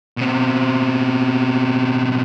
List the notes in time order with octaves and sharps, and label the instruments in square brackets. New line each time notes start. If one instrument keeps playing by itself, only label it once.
[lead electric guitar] B2 C4